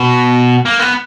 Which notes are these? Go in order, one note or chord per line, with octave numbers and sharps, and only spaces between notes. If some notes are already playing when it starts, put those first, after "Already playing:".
Already playing: B2
A#3
B3